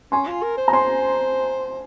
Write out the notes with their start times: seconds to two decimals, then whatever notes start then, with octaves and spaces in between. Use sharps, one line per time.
0.12 C#4 G#5 C6
0.27 F4
0.43 A#4
0.58 C5
0.68 A#5
0.73 C5 G#5 C6